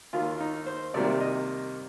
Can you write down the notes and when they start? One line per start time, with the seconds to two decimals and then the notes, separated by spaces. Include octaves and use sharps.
0.13 D#2 D#3 A#3 F4
0.41 D#4
0.66 C5
0.94 C2 C3 D#3 G3 A#3 D5
1.21 D#5